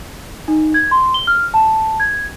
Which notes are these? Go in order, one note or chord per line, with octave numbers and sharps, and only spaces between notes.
D#4
G#6
C6
G7
F6
A5
G#6